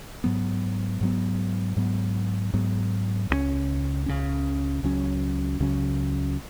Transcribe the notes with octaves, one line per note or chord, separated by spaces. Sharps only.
G#2 F#3 B3
G#2 F#3 B3
G#2 F#3 B3
G#2 F#3 B3
C#2 C#3 F#3 C#4
C#2 C#3 F#3 C#4
C#2 C#3 F#3 C#4
C#2 C#3 F#3 C#4